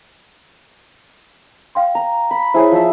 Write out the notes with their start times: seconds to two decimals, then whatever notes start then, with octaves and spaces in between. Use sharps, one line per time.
1.75 F5 G5 C6
1.95 A#5
2.31 B5
2.54 E4 G#4 C5 C#5
2.71 F3 E5